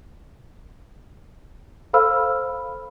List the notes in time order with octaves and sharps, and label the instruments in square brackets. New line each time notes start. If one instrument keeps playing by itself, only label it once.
[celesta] A4 C5 F5 B5 E6 F6